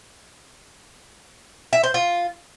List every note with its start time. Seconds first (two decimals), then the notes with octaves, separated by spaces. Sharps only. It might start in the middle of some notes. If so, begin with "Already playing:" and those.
1.73 E5
1.83 C5
1.94 F4